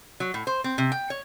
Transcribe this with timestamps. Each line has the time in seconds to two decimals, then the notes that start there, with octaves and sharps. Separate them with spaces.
0.20 F#3
0.34 A2
0.47 C5
0.64 C4
0.78 C3
0.92 G5
1.10 C#5